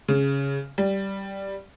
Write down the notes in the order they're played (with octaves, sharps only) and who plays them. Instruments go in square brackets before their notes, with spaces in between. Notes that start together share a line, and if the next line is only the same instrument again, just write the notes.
[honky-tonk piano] C#3
G3